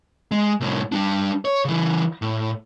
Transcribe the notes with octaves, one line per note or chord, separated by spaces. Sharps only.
G#3
C2 A2
G3 D4
C#5
C#3 E3
A2